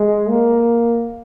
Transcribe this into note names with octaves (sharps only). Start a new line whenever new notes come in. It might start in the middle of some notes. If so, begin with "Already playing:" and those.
Already playing: G#3
A#3